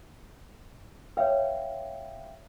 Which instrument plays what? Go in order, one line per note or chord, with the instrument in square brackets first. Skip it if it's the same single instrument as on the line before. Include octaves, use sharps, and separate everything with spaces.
[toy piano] B4 C#5 [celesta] E5 F5 G5